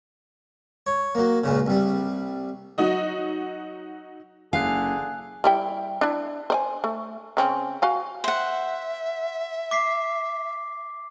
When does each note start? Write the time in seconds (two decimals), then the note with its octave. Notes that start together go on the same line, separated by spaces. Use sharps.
0.87 C#5
1.15 F#3 A#3
1.44 C#2 A#2 C#3
1.66 C2 G3
2.78 F#3 D#4 F#4 D#5
4.53 F#1 D3 G#4 F5 G#5 F#6
5.44 G3 E4 G5
6.01 D4 E4
6.50 C5 D5 G#5
6.84 A3
7.37 C#3 C4 C#4
7.82 F#4 F5 G#5
8.24 C5 E5 F#5
9.71 D6 B6 C7